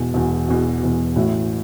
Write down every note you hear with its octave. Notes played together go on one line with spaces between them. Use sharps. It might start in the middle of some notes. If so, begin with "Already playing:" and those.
Already playing: E1 E2 B2
E1 E2 B2
E1 E2 B2
E1 E2 B2
A1 A2 A3 F#4